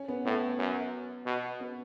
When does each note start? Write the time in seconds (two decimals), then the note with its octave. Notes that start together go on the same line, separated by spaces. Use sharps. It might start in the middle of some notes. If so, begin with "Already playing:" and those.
Already playing: C#4
0.09 B3
0.25 A2 B3
0.59 F#2
1.26 B2
1.60 B3